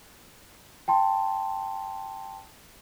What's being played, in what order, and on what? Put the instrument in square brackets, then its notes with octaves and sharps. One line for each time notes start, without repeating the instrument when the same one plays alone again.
[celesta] G5 A5 C6